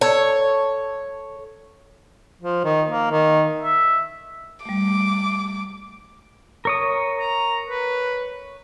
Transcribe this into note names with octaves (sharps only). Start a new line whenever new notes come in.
A4 C#5
F3
D#3
A#3
D#3
E5
G3 A3 D6
A#4 C#5 D#6
A#5
B4